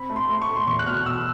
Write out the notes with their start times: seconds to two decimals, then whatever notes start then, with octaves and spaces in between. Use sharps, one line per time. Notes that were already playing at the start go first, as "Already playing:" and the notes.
Already playing: C4 B5
0.10 A3
0.16 C6
0.29 A3
0.42 C#6
0.48 A3
0.56 C6
0.67 E2 C#6
0.79 F#6
0.87 B2 F6
1.06 B2 E6